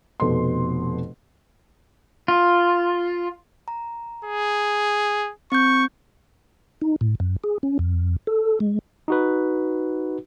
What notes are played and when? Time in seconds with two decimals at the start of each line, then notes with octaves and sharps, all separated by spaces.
0.20 F1 B2 A4 C6
2.28 F4
3.68 A#5
4.25 G#4
5.52 C4 C#6 G6
6.82 D#4
7.01 A2
7.20 F#2
7.44 G#4
7.63 C#4
7.79 F2
8.27 A4
8.60 G#3
9.08 D#4 F#4 B4